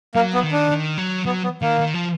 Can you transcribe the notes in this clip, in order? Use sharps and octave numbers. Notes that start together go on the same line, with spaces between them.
F#3 A#3
B3
D#3
D4
D#3
F#3
F#3 B3
B3
D#3 A#3
D#3
F3